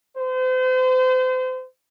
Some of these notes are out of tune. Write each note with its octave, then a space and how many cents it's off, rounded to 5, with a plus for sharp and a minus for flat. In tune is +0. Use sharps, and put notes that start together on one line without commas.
C5 -35